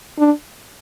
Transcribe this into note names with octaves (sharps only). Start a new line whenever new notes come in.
D4